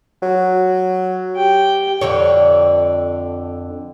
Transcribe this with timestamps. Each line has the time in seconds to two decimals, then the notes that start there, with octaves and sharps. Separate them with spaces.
0.22 F#3
1.36 G4 G5
2.01 F2 D3 C#5